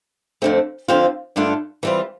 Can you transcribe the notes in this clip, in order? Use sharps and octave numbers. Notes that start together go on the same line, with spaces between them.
F2 D3 A3 C4
F2 D3 F3 C4 F4
G2 D3 A3 D4 F4
E3 G3 C4 F4